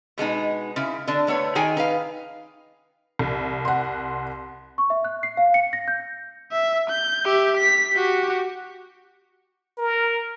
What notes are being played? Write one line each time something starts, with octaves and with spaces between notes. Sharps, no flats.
B2 G#3 B3 D#4
C#3 E4
D3 D4
D3 A3 B3 C#5
D#3 D#4 G#4 G5 G#5
D#4 B4 F5
C2
F#5 C6
C#6
E5
F#6
C7
F5
C#7
A#6
G6
E5
G6
G4 E5
B6
F#4 G4
A#4